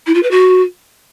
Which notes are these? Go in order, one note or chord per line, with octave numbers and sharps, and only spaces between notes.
E4
F4
B4
F#4